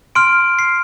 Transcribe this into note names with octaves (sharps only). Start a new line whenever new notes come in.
C6 F6 D7
C7